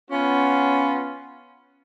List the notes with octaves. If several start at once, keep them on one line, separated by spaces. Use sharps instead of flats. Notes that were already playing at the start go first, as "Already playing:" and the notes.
B3 C#4 F4